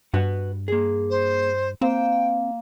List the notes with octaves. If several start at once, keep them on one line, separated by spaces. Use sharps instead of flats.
G2 F#4 B4 F#5
A#3 G#4
C5
A#3 C4 C5 G5